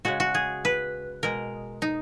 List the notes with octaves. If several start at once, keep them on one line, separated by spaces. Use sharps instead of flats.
C#3 G#3 F#4
F#4
G#4
B4
B2 G#3 A#4
D#4